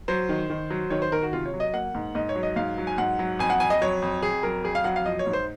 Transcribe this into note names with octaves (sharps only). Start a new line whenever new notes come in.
F#3 C5
D#3
D#3
F#3
D#3 C#5
C5
D#3 A#4
F#4
C3 F4
C#5
F#3
D#5
A#3 F#5
G#2
G#2 D#5
C#5
F#3
D#5
G#2 F5
F#3
G#5
G#2 F#5
F#3
F2 G#5
F#5
F2 G#5
D#5
F#3 C#5
F2
F2 G#4
F#3 A#4
F2 G#4
F5
F#3 F#5
F5
F3 D#5
C#5
G#2
C5